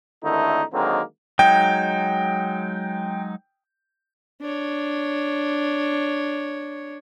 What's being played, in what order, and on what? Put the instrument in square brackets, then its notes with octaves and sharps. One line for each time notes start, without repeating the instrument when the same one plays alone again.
[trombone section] G#1 D3 D#3 A3 D#4 E4
D3 D#3 F#3 G#3 A#3 C4
[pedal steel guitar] F#3 G#3 D#4 [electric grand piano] G5
[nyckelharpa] D4 C#5